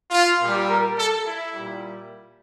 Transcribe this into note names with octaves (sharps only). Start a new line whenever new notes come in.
F4
A#2 G3
A#4
A4
E4
A#2 G3